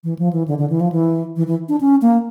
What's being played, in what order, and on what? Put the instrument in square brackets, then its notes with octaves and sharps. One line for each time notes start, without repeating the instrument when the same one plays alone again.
[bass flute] E3
F3
E3
D3
D3
E3
F3
E3
E3
E3
D4
C#4
A#3